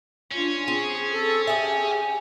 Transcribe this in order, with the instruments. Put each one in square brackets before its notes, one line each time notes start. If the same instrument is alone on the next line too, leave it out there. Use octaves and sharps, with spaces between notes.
[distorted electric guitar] C#4 [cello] D4 F4
[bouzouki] C4 [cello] G#4
[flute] A4
[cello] G4 [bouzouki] G#4 E5 [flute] G#5